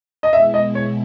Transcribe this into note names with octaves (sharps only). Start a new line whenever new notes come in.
D#5
B2 G#3 B3 E4 E5
D#5
C#5